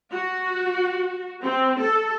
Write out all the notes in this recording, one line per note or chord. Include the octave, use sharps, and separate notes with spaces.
F#4
C4
A4